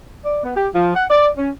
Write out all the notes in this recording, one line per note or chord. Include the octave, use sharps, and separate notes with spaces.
D5
B3
G4
F3
F#5
D5
C#4